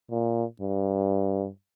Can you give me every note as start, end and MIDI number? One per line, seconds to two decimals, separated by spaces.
0.11 0.44 46
0.61 1.48 43